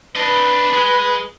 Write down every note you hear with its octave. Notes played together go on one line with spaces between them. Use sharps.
D4 B4 D#5
G#3